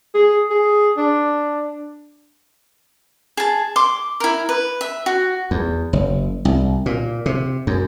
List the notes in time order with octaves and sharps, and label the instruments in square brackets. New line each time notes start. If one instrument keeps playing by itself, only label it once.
[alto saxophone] G#4
G#4
D4
[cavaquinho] G#4 A5
C6 D6
E4 A#4
B4
E5
F#4
[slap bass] E2
F#1
C2
A#2
C3
F#2